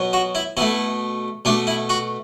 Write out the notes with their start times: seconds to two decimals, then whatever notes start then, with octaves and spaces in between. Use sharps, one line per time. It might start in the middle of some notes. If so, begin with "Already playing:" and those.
Already playing: B2 F#3 B3
0.13 F#4
0.35 E4
0.57 B2 A3 E4
1.45 B2 A3 D4
1.67 E4
1.89 F#4